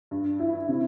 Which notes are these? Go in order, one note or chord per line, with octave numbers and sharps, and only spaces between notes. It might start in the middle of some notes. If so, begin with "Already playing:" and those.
G2
E4
C3